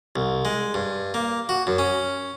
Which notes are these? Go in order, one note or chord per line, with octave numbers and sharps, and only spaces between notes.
C2
G#3
G2
A#3
F#4
F#2
C#4